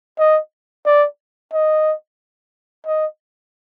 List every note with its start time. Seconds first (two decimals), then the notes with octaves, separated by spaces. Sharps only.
0.19 D#5
0.86 D5
1.53 D#5
2.86 D#5